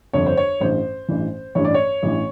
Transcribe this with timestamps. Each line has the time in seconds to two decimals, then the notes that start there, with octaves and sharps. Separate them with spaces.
0.13 G1 F2 D3 C#5
0.26 C5
0.37 C#5
0.60 A1 G2 E3 C5
1.08 A1 G2 E3
1.55 A1 G2 E3 C#5
1.65 D5
1.74 C#5
2.03 A1 G2 E3